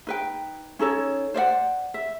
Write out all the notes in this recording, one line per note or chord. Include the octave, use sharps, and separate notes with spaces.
D#4 B4 G5
C#4 D#4 A4 C#5
C5 D5 D#5 F#5
E5